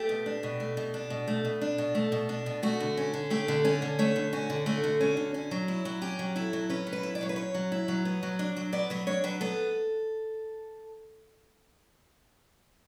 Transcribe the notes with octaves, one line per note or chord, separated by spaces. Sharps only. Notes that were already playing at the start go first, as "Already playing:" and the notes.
Already playing: A3 G4
B2
D4
B2
A3
B2
D4
B2
A3
B2
D4
B2
A3
B2
D4
B2
A3 F#4
D3
C#4
D3
A3 G4
D3
C#4 A4
D3
A3 C#5
D3
C#4 F#4
D3
A3 F#4
D3
C#4
D3
C#4
F#3
E4
F#3
C#4 G4
F#3
E4 A4
F#3
C#4 B4
F#3
B4
E4
D5
F#3 C#5
B4
C#4 C#5
F#3
E4
F#3
B3
F#3
D4
F#3
B3 D5
F#3 B4
D4 C#5
F#3 B4
B3 A4